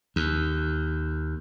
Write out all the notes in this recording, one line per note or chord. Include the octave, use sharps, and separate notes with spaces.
D#2